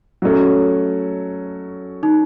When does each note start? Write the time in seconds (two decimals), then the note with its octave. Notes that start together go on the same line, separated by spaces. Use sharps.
0.22 F#3 A3 C#4
2.03 D#4